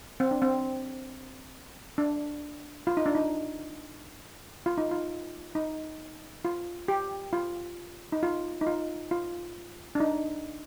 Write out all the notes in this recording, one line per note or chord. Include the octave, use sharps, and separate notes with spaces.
C4
D4
C4
D4
F4
D#4
D4
D#4
F4
D#4
F4
D#4
F4
G4
F4
D#4
F4
D#4
F4
F4
D4
D#4